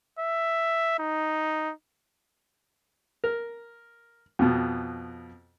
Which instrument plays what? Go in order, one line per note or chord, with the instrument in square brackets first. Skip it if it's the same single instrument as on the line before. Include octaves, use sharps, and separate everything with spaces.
[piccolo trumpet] E5
D#4
[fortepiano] A#4
F2 B2